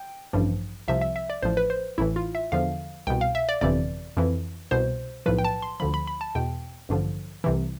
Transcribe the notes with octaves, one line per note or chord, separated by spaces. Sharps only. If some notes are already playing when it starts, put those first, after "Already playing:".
Already playing: G5
A1 G2 F3
C2 C3 F3 E5
E5
E5
D5
A1 A2 F3 C5
B4
C5
A1 A2 E3 E4
F4
E5
E2 D3 F3 F5
C2 B2 G5
F5
E5
D5
G1 F2 C3 E3 D5
F2 E3
C2 B2 C5
B1 A2 F3 B4
G5
A5
C6
D2 D3 F3 B5
B5
B5
A5
E2 B2 G5
A1 G2 D3 F3
C2 C3 E3